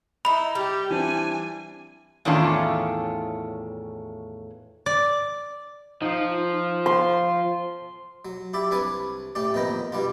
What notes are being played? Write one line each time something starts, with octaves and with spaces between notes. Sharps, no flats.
D#4 E4 B5
G3 G4
E3 C4 D4 G#5
E2 A2 D#3 C#4 D4 F4
D5
F3 D#4
C5 C6
F#3
E4 G4 D5 E5
C2 D4 B4 G#5 C#6 D6
A2 C#4 G4 D5
F2 A#2 D#3 B3 G5 A#5
B2 G3 D4 F4